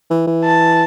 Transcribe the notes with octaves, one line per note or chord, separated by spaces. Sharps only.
E3
E3
A5